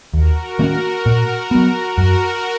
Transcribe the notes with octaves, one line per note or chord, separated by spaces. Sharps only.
D#2 F#4 A#4
D#3 A#3 C#4
A#2
F#3 B3
F#2 F#4 A#4